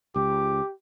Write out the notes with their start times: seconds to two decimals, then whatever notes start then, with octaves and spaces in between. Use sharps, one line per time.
0.16 C#2 G4 D6